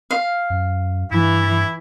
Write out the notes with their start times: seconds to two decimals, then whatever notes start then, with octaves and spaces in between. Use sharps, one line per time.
0.11 F5
0.50 F#2
1.11 G2 E3 E4